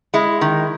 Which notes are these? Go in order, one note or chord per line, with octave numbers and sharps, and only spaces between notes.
G#3 E4
D#3